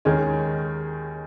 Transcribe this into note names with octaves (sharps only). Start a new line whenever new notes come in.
D#2 D#3 G#3 C#4 G#4